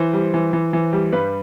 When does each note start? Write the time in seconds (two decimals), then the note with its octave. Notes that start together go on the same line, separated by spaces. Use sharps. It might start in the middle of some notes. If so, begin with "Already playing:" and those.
Already playing: E3 C5
0.13 G3
0.34 E3
0.53 E3
0.73 E3
0.93 G3
1.12 G2 B4